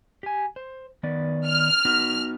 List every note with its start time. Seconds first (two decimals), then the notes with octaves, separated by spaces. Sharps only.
0.23 G4 G#5
0.56 C5
1.03 D#3 B3 D5
1.45 F6
1.85 B3 D#4 F#4